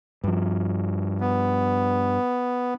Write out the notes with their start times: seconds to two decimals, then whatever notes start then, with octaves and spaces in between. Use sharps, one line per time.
0.24 G2 F3
1.20 B3